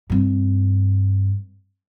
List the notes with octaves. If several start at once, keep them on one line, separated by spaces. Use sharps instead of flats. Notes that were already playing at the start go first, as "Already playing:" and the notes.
G2 C4